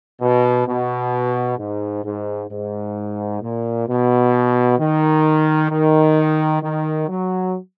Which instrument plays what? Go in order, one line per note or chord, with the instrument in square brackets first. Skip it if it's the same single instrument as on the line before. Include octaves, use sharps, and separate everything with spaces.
[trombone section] B2
B2
G#2
G#2
G#2
A#2
B2
D#3
D#3
D#3
F#3